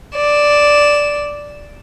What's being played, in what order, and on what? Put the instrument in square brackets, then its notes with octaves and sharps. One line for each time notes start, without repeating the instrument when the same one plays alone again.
[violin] D5 E7